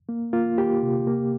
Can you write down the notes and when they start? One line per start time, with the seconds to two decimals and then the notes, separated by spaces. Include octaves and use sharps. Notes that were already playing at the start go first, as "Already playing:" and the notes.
0.09 A#3
0.33 A#3 F4
0.58 A#3 G4
0.83 C3
1.07 A#3